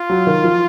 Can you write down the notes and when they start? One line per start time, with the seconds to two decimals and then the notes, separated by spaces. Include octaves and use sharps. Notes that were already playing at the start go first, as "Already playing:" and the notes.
Already playing: F4
0.10 F#3
0.27 D#3
0.44 F3